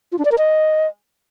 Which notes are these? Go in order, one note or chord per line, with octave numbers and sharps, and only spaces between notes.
F4
D4
D5
A#4
D#5